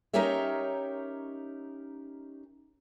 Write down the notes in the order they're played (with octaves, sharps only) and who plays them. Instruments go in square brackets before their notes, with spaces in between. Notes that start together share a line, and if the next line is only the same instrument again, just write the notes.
[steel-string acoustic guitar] C#4 D#4 G4 A#4 C#5 E5